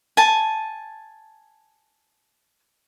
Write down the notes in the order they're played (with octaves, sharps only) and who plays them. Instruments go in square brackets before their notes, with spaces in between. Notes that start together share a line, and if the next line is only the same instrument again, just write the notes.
[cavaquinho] G#5 A5